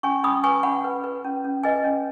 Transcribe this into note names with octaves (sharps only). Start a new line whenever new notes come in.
C#4 G#5 C#6
C#4 B5 D#6
B4 G#5 C#6
C#4 F#5 B5
B4
B4
C#4
C#4
B4 D#5 G#5
C#4